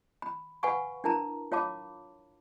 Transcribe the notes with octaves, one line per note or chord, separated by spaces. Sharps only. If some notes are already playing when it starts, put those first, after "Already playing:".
B5
B4 F5 F#5 G#5 B5 C#6
D4 E4 A#4 A5 A#5
F4 C#5 F5 A5 B5 D6